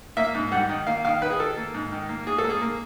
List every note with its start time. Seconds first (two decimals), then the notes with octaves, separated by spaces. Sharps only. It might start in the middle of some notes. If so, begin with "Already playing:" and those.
0.17 A#3 E5
0.35 G#2
0.52 G3 F#5
0.69 D#3
0.87 A#3 F5
1.05 D#3 F5
1.22 D#3 B4
1.30 G#4
1.39 D#3 A4
1.57 A#3
1.74 G#2
1.92 D#3
2.09 A#3
2.27 G#2 G#4
2.38 A4
2.44 A#3
2.50 G#4
2.62 A#3